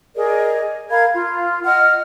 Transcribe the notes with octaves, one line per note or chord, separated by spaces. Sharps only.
G#4 A#4 D5 D#5
A#4 F5 B5 G#6
F4
D#5 F#5 F6